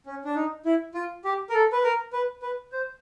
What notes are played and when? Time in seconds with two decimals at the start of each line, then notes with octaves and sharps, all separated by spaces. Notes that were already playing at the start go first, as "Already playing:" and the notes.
0.06 C#4
0.25 D4
0.35 D#4
0.65 E4
0.94 F4
1.24 G4
1.49 A#4
1.54 A4
1.72 B4
1.83 A#4
2.13 B4
2.42 B4
2.72 C5